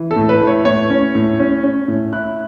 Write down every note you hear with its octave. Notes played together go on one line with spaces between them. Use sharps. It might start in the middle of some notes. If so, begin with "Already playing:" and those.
Already playing: E3
A4
A2
B4
A3
C#5
A2 C#5
C#4
A2
C#4
C#4
A2
E4 F#6